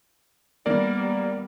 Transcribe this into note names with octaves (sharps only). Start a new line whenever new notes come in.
G3 A#3 B3 A#4 D5